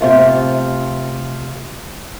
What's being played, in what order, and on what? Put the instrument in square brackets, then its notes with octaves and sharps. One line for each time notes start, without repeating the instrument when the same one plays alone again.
[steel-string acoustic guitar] C3 A3 F4